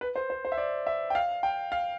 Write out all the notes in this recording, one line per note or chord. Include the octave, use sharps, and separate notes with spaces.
B4
C5
C5
C5
E5
D5
E5
G5
F5
G5
F5